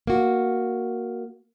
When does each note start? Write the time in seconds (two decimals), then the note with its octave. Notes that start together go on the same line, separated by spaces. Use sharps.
0.07 A#3 F#4